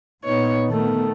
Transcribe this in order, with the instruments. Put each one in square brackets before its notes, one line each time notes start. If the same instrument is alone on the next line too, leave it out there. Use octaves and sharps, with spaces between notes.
[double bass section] A#2 [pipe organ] B3 D#4 [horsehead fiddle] C#5
[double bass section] D#3 B3 [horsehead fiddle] A3 [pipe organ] A4